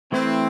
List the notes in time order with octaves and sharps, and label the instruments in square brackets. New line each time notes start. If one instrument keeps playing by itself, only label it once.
[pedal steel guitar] E3 A3 E4 B4 [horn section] C4